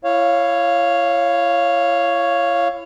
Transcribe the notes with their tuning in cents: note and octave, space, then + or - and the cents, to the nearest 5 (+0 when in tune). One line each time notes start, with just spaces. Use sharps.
E4 +35 C#5 +0 F5 +0